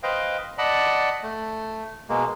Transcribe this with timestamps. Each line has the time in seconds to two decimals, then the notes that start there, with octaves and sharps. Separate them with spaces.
0.03 B4 C5 D#5 F5 G5
0.58 D5 D#5 F#5 A5 B5
1.23 A3
2.09 B2 G#3 A#3